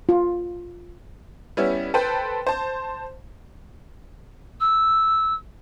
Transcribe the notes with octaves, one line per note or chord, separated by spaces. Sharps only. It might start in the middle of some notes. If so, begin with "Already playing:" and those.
F4
G3 B3 C#4 E4
A4 B4 C5 G5
C5 A5
E6